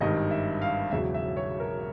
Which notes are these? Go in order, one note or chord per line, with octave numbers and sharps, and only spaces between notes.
G#1 G2 D#3 D#5
E5
F5
E1 E2 C#3 F#3 E5
E5
C#5
A#4